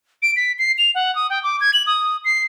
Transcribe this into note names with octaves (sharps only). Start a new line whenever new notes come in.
D7
B6
C7
F7
F#5
D#6
G5
D6
G#6
F#7
D#6
C7